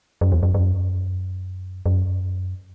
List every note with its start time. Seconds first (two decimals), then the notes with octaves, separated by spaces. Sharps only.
0.21 F#2
0.32 E2
0.43 F#2
0.54 F#2
1.86 F#2